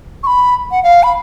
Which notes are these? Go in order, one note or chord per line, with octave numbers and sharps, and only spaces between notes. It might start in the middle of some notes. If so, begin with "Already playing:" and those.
C#6
B5
F#5
F5
B5